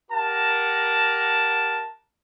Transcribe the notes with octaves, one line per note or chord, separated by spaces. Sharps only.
G4 A#4 F#5 A5